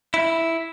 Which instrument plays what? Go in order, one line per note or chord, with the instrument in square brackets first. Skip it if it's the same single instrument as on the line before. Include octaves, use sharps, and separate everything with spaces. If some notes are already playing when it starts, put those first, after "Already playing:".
[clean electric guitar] E4